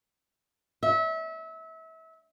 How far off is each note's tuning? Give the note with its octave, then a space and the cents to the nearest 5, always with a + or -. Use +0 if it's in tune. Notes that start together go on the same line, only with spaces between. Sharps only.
E5 -30